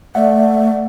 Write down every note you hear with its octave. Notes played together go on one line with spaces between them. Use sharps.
A3 D5 E5 F#5